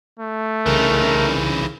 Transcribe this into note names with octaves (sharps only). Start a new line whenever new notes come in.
A3
C2 C#3 E3 D#4 A#4